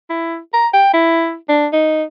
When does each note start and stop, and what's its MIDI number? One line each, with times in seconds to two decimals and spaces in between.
0.09 0.38 64
0.53 0.68 82
0.74 0.91 79
0.93 1.35 64
1.49 1.67 62
1.73 2.03 63